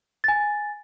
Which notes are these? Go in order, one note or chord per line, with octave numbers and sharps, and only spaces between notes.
G#5 A6